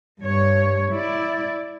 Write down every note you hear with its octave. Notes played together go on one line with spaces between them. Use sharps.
G2 C#5
E4 D5